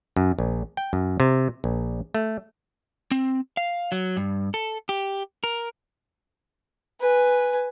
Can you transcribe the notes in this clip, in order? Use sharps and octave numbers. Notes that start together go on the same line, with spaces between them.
F#2
A#1
G5
F#2
C3
A#1
A3
C4
F5
F#3
G2
A4
G4
A#4
B4 G#5